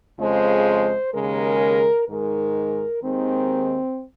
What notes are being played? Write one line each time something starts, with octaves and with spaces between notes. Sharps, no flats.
F2 C#3 F3 G#3 C5
D#2 C#3 G#3 A#4
G#2 D#3 G#3 A#4
D#2 D#3 G#3 C4